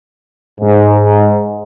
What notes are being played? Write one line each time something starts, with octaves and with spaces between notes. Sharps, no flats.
G#2